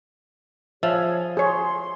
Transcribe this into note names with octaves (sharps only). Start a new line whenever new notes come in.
F3 G#4 C#5 E5
G#4 C#5 C6